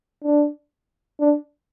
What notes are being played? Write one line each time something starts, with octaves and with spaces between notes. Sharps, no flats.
D4
D4